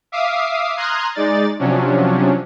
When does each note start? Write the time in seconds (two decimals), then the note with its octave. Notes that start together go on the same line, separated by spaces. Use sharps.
0.12 E5 F5 D6 D#6 C7
0.77 A#5 C6 D#6 F6 F#6 G#6
1.15 G#3 D#4 D5 A6
1.59 C3 F3 F#3 C#4 D4